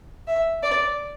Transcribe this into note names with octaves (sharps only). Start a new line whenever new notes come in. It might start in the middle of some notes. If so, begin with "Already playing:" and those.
E5
D5